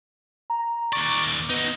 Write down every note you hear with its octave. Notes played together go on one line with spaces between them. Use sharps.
A#5
D#2 D5 C#6
B3 D#4 F#4